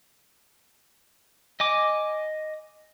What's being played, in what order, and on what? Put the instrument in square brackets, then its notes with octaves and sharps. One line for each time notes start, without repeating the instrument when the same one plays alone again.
[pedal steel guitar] D#5 G#5 D6